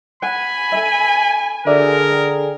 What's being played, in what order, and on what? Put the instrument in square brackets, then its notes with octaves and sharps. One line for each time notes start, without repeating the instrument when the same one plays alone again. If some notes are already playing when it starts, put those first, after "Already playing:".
[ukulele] F#5 [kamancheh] G#5 [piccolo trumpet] B5
[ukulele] A4 E5
[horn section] D3 G#4 [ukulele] F#4 D5 E5 [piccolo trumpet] A#4
[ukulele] G5